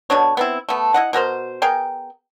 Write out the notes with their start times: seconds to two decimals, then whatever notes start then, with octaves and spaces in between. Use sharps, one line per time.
0.10 B2 D3 D4 C#5
0.37 B3 C4 E4
0.69 A3 B3
0.94 E4 D#5 F#5
1.13 B2 F#4 A#4 C5
1.62 B3 G#4 A#4 G5